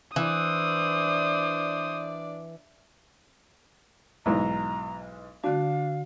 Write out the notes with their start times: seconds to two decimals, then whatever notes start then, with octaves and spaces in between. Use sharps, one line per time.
0.16 E3 D4 C5 D5 D#6
4.26 B1 G#2 E3 A#5
5.44 D3 D4 F#4 F5